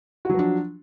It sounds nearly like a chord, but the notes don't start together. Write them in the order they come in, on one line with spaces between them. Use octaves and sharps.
F#4 F#3 F3 D4